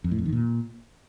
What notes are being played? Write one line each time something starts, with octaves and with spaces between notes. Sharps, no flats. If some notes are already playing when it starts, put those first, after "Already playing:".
F2
A2
F2
D#3
A#2